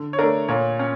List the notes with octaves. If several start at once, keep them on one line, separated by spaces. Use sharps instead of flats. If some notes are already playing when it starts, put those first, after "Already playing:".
Already playing: D3
C#5
A3 D4 A#4
A#2 C#5
C#4